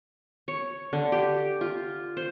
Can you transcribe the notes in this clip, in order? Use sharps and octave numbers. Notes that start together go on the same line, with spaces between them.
C#5
D3
G4
F4
C5